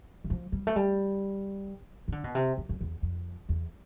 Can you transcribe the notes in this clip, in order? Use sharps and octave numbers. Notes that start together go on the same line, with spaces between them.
E3
F3
G3
A3
G3
E3
D3
B2
C3
F2
F2
E2
F2
E2